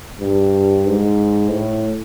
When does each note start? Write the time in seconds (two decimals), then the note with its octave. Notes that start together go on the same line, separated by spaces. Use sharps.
0.20 G2
0.86 G#2
1.51 A2